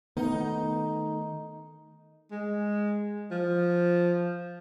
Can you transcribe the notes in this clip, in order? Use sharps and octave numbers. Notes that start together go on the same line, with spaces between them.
D#3 A3 B3 D#4
G#3
F3